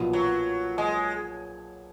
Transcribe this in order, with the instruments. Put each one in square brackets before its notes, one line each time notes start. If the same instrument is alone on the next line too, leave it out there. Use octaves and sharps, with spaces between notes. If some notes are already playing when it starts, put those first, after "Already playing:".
Already playing: [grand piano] B1 A#2 F3 B3 F#4
[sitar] F#3
G#3